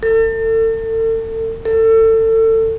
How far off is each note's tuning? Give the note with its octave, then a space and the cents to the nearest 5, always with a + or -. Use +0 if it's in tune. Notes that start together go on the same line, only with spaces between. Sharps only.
A4 +40
A4 +30